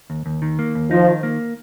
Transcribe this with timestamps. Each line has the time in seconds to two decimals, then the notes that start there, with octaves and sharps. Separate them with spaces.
0.10 D#2
0.26 D#2
0.42 D#3
0.59 A#3
0.75 D#2
0.91 F3 D#4
1.07 D#3
1.23 A#3